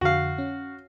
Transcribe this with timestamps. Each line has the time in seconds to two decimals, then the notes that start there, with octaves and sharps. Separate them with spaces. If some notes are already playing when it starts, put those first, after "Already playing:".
0.01 F2 D3 F#4 F5
0.38 C#4